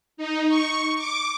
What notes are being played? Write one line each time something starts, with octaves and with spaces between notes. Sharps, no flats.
D#4
C#6
D6